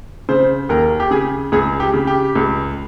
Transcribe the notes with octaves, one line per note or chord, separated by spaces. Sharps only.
C#3 C5
D#2 A#4
G4
C#3 G#4
C#2 G#4
G4
C#3
G4
C#2